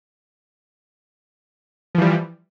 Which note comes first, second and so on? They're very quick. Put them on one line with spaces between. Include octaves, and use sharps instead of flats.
F3 E3 G3